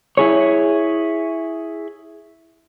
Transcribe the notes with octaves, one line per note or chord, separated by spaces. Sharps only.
E4 G#4 C#5